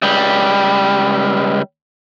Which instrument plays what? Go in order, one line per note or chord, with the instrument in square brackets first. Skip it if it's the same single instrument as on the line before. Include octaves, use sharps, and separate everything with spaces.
[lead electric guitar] C#2 G3